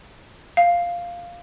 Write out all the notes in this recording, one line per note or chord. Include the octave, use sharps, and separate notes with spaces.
F5